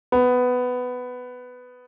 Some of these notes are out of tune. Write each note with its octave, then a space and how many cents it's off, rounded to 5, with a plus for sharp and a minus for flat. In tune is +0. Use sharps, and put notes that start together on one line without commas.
B3 +10